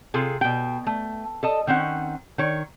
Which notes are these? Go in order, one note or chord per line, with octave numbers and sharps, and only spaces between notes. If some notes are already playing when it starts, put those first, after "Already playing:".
C3 F4 G#4 A4
B2 G5
A3
A4 D#5 A5
D#3 C4 C#4 F#5
D#3 C#5